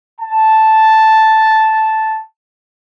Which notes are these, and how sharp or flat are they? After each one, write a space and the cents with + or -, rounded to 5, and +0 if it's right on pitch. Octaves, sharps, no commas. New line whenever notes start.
A5 -5